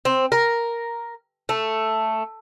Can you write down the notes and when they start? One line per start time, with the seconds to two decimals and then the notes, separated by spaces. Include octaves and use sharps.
0.05 C4
0.32 A#4
1.49 A3